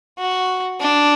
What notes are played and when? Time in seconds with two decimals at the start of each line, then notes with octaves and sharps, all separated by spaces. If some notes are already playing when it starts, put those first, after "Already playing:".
0.19 F#4
0.80 D4